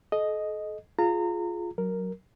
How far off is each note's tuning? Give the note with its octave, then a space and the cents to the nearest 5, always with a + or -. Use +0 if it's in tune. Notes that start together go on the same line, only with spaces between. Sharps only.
A4 -40 D#5 +0
F4 +0 G#4 +15 A#5 -30
F#3 +5 A#4 +0